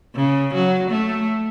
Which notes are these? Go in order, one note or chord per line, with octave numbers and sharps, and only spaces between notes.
C#3
F#3
A3